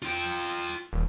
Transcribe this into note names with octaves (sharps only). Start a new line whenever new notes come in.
F4 G5
D#1